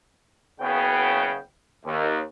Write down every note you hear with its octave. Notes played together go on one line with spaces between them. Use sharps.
F#1 C#3 B3 G5
D#2